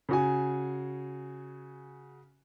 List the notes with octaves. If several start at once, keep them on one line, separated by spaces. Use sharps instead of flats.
C#3 F#4 G#5